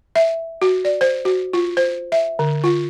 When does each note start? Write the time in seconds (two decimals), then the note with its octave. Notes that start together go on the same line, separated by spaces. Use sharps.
0.16 E5
0.62 F#4
0.85 D5
1.01 C5
1.25 F#4
1.53 F4
1.77 C5
2.12 E5
2.39 D3
2.64 F4